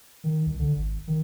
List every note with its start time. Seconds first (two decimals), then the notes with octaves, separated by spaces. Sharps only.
0.24 D#3
0.46 C2
0.59 D3
0.76 G#1
1.08 D#3